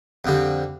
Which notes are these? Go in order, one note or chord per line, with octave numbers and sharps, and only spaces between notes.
F2 D3 G3